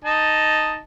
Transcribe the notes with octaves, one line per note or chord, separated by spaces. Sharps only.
D#4 D#5 A5